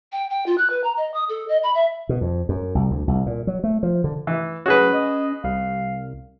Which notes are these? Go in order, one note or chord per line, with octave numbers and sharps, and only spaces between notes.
G5
G5
F4
F#6
B4
A#5
D#5
D#6
A4
D#5
B5
E5
B2
F2
F#2
C2
D2
C2
A#2
F#3
A3
F3
D3
E3
F#3 C#4 F#4 G#4 B4
D#5
C2 F5